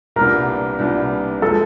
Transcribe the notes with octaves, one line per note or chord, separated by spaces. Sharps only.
C2 A#2 G3 B3 D4 A#4
C2 A#2 G3 B3 D4
F3 G#3 A4